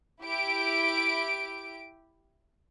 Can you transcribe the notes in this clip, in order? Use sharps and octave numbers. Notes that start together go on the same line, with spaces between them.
E4 G4 D7